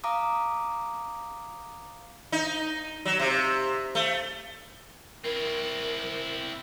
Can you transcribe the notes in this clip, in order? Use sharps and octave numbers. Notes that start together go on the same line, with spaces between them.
F5 A#5 D6 D#6
D#4
F#3
C3
A3
C4 E4 A#4